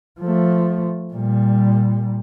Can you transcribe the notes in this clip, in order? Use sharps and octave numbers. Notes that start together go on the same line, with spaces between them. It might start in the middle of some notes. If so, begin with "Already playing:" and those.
F3 A3
A#2 G3